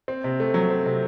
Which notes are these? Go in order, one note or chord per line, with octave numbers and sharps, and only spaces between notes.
C4
C3
A3
F#3
C4
C3